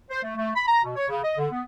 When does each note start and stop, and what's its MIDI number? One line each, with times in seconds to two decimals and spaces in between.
0.11 0.20 72
0.23 0.33 57
0.37 0.50 57
0.55 0.63 83
0.67 0.81 82
0.84 0.95 47
0.96 1.07 73
1.09 1.22 49
1.24 1.35 75
1.37 1.48 50
1.51 1.62 59